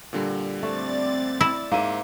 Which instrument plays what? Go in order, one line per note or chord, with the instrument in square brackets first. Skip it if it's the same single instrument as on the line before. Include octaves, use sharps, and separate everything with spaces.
[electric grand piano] A#2 D3 G3
[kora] A3 [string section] C4 D5 A6
[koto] E4
[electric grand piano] G#2 D#7 [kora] A#3 E5